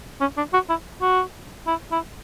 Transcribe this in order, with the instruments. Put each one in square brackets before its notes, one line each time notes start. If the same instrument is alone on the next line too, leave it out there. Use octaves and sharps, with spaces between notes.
[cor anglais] C#4
D4
F#4
E4
F#4
E4
E4